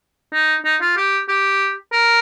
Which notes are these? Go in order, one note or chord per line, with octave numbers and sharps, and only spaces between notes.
D#4
D#4
F4
G4
G4
A#4